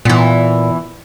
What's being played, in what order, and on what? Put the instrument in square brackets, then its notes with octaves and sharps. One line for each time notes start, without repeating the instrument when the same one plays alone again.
[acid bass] A#2 [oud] E3 B3